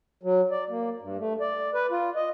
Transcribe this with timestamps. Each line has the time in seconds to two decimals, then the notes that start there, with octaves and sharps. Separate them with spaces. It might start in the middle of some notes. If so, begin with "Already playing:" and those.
0.23 F#3
0.51 D5
0.70 A#3
1.02 G2
1.18 A3
1.41 D5
1.74 B4
1.91 F4
2.15 D#5